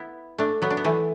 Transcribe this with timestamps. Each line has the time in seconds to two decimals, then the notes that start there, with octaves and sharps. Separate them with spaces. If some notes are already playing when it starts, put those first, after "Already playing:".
Already playing: B3 E4
0.38 A3 D4
0.62 F#3 B3
0.70 D4
0.77 B3
0.84 E3 A3